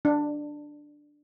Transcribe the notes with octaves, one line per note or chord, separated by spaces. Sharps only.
D4